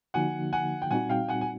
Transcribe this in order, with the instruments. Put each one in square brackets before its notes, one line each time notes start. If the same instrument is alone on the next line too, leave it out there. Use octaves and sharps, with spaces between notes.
[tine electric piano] D3 F3 A#3 D#4 F#4 [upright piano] F#5 G#5
[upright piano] F#5 G#5
G5
[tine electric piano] A#2 G3 C4 D#4 F#4 [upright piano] F#5 G#5
[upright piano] F5 G5
F#5 G#5
G#5